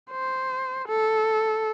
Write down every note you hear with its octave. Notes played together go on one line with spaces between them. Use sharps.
C5
A4